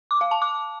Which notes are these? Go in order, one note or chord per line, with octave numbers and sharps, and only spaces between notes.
D6
F5
A5
D6